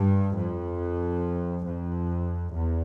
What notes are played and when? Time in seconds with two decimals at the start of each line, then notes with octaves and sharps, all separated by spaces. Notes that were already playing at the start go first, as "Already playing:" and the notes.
Already playing: G2
0.36 F2
1.65 F2
2.52 E2